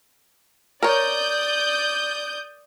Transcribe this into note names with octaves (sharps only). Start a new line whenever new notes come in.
A#4 C#5 D5 D#6 G6